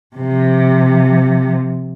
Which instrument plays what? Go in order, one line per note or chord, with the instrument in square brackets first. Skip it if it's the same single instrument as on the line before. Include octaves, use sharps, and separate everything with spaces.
[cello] C3 F3